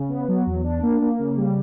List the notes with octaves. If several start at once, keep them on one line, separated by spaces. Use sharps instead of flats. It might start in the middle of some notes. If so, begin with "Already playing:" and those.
Already playing: C#3
B3
F#3
E2
D4
A#3
A#3
C#3
G3